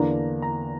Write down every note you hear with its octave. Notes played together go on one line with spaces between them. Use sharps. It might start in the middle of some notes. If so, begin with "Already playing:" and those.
Already playing: E2 D3 A#3 D4 A#5
A#5